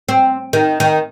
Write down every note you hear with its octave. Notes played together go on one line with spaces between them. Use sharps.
C4
D#3
D#3